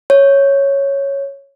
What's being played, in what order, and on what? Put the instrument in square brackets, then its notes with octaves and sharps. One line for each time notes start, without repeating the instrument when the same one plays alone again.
[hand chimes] C#5